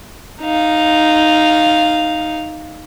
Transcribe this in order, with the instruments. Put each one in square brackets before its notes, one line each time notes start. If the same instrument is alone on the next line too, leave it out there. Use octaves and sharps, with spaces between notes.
[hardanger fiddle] D#4 F5